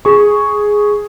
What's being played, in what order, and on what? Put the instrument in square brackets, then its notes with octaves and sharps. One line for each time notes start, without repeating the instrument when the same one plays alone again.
[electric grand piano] G#4 C#6